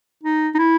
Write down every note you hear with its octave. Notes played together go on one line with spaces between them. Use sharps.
D#4
D#4
E4